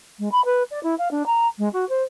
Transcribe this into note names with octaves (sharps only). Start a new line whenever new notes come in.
G#3
B5
B4
D5
E4
F5
D4
A#5
G#3
F#4
C5